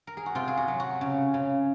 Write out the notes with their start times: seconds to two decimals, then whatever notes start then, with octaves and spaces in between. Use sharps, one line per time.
0.07 A#4
0.17 G#4
0.26 F#4
0.35 C3 F4
0.48 G#4
0.57 F#4
0.68 F#3
0.80 F#4
1.01 C#3
1.34 C#3